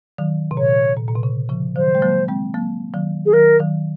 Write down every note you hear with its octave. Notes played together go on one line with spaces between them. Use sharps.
D#3 F#3
C3
A#2 C#5
A#2
A#2
C3
C#3
C#3 F3
D#3 F#3 C5
G#3
F#3 A#3
G#3 C4
F#3 A#3
D#3 F#3
G#4
D#3 F#3 A#4
D#3 F#3